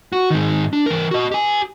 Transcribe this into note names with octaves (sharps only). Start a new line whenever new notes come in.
F#4
G#2 D#3
D4
E3 A#4
F#4 D#5
G4 G#5